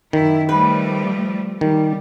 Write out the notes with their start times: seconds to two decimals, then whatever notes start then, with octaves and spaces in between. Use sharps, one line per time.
0.13 F#2 D#3 E4
0.49 F3 G3 A3 B4
1.61 D#3 G3